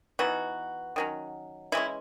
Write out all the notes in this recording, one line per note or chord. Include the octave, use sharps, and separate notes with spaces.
E3 B3 D#4 F#4
D#3 F#3 C#4
E3 G#3 C#4 E4